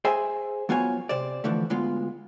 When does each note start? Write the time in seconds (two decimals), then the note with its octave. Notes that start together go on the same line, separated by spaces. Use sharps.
0.05 G#4 C5 E5 G#5
0.69 F#3 B3 F4 C#5 G#5
1.09 C3 C5 D5
1.44 D3 E3 F3 A3
1.70 D2 G#3 B3 F4